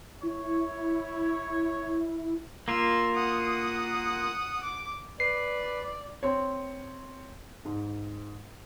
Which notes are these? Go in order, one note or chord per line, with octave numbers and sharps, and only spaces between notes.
E4 C#5
A#3 F4 E6
F#5 D#6
D6
B4 D5 C7
C4 C#5
G#2